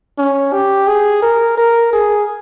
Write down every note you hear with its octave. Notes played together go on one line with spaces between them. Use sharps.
C#4
G4
G#4
A#4
A#4
G#4